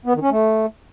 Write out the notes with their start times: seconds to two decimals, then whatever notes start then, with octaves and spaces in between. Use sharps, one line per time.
0.06 B3
0.14 D#3
0.22 C#4
0.30 A3